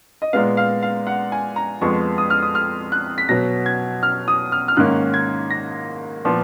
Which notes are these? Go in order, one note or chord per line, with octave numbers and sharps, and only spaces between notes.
D#5
A#2 G#3 B3 F5
F5
F5
F#5
G#5
A#5
F2 F3 G#3 B3 C#6
D#6
F6
D#6
F6
F#6
B6
B2 F#3 B3 A#6
G#6
F6
D#6
F6
F6
G#2 D#3 A#3 C#4 F#6
G#6
A#6
A#2 F3 B3